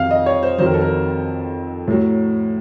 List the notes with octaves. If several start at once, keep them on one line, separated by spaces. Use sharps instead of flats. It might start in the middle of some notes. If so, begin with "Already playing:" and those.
Already playing: F2 D#3 F#3 F5
D#5
C#5
C5
F2 D#3 F#3 C5
A#4
A4
A#4
A2 F#3